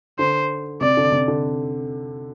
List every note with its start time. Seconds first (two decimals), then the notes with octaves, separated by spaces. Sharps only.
0.19 D3 C5
0.81 C3 D5
0.97 D3
1.12 C3
1.28 D3